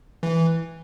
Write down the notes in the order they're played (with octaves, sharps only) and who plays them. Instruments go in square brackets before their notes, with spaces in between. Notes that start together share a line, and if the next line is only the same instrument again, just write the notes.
[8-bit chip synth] E3